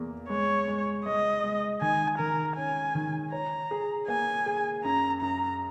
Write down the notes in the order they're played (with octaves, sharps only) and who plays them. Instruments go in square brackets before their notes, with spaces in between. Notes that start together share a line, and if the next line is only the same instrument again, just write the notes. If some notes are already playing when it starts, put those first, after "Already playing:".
Already playing: [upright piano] E2 A#3
[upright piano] G#3 [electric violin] C#5
[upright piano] G#3
[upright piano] G#3 [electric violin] D#5
[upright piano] G#3
[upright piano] D#3 [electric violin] G#5
[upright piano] D#3 [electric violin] A#4
[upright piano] C#4 [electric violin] G#5
[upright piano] D#3
[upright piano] C#5 [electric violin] A#5
[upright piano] G#4
[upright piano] A#3 [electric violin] G#5
[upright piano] G#4
[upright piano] F#2 [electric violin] A#5
[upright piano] F#2 [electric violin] A#5